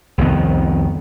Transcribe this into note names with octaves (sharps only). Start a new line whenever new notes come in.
C2 F2 D#3 B3